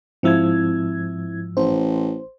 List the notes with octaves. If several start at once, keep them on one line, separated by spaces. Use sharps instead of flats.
G#2 F3 C4 E4 E6 G#6
A1 C5